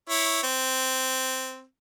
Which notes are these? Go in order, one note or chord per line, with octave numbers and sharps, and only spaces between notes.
E4 C#5
C4